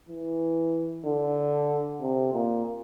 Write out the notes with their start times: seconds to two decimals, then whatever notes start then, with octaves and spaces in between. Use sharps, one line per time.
0.09 E3
1.05 D3
2.01 C3
2.33 A#2